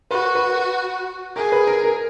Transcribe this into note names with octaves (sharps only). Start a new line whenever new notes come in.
F#4 B4
B4
G#4 A#4
B4
A#4
A#4